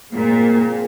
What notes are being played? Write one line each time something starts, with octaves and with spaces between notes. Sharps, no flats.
A#2 F3 C4 F4 G#4